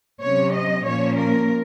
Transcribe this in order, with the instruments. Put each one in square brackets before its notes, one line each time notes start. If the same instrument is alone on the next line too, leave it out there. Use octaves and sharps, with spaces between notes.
[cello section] C3 F#3 C#4 C#5
D#5
A#2 F3 A#3 C#4 C#5
A#4